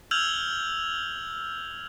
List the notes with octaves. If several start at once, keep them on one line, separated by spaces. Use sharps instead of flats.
E6 F6 G6 G#6 F7 F#7